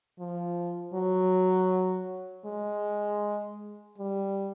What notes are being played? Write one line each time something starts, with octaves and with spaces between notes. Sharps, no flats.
F3
F#3
G#3
G3